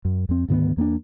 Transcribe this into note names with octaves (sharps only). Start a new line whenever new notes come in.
F#2
F2 C4
D2 G#2 D#3 B3
E2 A#3 C#4 D4